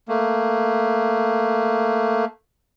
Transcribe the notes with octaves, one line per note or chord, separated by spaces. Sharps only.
A3 A#3